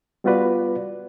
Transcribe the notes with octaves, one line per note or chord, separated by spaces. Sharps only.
G3 B3 F4 F#4 B4 D5